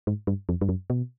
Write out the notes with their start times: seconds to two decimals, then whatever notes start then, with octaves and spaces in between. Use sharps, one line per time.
0.07 G#2
0.27 G2
0.49 F2
0.61 G2
0.69 F#2
0.90 B2